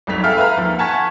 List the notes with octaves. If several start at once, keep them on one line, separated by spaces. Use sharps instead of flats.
C2 F2 G#2 F#3 B6 F7
G#4 A4 E5 F5 G5 F6
B4 E5 F5 A#5
D#2 F3
F#5 G#5 A5 C#6 G#6 B6